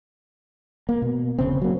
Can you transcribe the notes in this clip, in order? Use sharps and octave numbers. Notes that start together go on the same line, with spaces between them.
A#3
B2
E1 C#3 C4
F#3 A#3